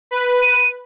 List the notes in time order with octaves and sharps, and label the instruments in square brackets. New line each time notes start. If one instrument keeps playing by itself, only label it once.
[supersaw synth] B4
[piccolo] D#7